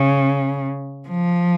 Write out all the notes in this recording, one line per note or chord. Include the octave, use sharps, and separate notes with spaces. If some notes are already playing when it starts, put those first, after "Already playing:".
Already playing: C#3
F3